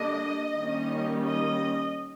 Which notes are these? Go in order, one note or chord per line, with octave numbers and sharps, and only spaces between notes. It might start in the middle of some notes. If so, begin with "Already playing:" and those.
Already playing: D3 G3 A#3 D4 D#5
D#3 G3 A#3 C#4
D#5